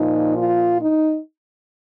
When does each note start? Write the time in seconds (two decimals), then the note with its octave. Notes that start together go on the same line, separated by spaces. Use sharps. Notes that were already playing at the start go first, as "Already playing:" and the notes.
Already playing: A#2 F3 D#4
0.36 F4
0.80 D#4